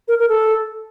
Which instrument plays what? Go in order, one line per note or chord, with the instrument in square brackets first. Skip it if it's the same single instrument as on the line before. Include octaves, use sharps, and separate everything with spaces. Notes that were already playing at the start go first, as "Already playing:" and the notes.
[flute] A#4
A#4
A4